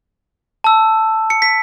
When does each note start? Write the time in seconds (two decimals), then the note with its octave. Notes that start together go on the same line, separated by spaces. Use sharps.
0.64 A5 E6
1.30 C#7
1.42 B6